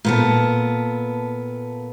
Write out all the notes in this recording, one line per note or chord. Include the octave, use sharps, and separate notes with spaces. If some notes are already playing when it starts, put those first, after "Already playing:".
A#2 B3 A4